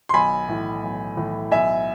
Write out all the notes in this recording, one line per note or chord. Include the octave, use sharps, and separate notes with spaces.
C6
B1 G#5 B5
A2 E3
B1
A2 E3
B1 E5 G#5